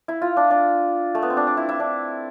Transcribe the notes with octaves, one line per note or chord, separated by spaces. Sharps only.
E4
F4
D4
D4
A3
B3
C4
D4
D4
E4
E4
D4